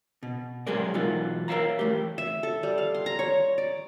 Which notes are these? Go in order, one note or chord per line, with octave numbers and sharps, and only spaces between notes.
B2
F#3 G#3 G4 G#4 A#4 D5
B2 E3 F#3 D#4 F4
A#4 C#5 E5 F5 A#5
E3 A3 G4
E5
A4
G3
F5
C6
A#5
C#5
D5